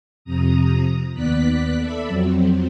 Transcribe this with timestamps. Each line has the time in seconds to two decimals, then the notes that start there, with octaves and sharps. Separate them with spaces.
0.24 F2 C3 A#5 D#6
1.14 D#2 B3 D5 F#6 B6
1.77 A4 D5 E5 B5
2.07 F2 F#3 C4